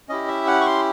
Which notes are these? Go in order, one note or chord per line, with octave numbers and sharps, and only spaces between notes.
C#4 E4 G4 D#5
E5
F#5
C#6
C6